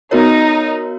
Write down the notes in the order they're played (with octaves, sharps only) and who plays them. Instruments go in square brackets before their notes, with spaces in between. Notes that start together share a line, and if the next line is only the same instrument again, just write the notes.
[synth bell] B3 F#4 A#4 C#5 [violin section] D#4